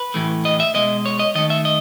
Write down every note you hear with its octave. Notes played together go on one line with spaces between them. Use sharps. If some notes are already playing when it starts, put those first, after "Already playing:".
Already playing: B4
A2 E3 A3
D#5
E5
B2 G#3 D#5
C#5
D#5
D#3 A3 D#5
E5
D#5